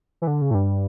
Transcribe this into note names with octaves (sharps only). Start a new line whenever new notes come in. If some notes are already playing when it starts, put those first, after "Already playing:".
E3
D3
C#3
A2
G2